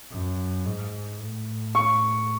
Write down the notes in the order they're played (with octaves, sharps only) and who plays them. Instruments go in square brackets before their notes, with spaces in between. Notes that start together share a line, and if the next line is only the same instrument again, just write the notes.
[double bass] F#2
G#2
A2
[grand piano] C#6